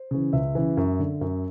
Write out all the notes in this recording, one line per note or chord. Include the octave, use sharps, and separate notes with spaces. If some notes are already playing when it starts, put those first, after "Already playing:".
Already playing: C5
C#3 E3
C#2 E5
C#3 E3
F#2
D3
F#2